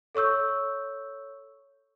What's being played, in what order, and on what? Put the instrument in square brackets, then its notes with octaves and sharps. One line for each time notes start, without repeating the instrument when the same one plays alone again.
[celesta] A4 C#5 C#6 E6 G6